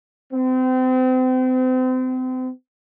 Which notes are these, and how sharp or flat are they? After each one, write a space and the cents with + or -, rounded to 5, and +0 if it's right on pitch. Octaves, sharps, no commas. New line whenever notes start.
C4 -35